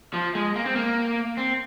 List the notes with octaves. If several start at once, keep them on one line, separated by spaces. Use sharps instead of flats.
F3
G#3
A#3
C4
A#3
C4